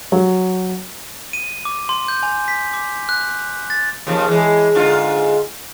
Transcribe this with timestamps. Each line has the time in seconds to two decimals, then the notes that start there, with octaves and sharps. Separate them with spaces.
0.12 F#3
1.33 D#7
1.65 D6
1.89 C6
2.08 G6
2.23 G#5
2.48 B6
2.74 D6
3.09 F#6
3.70 A6
4.07 D#2 C#3 F3
4.28 E3 G#3
4.75 G#2 D3 F4